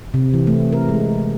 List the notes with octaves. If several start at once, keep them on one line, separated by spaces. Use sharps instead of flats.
C3
E3
A3
A#4
G#3